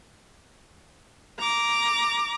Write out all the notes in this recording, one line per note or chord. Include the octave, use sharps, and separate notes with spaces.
A#5 D6